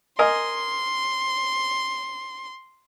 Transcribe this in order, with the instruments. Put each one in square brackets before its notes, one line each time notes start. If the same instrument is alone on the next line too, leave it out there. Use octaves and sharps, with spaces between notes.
[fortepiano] A#4 D#5 G#5 [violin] C6